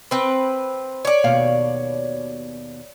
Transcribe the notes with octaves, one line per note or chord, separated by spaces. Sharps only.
C4 B4
C#5 D5
D#2 B2 F5